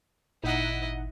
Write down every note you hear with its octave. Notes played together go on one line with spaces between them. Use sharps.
G#1 A#2 D#4 E4 D#5 F#5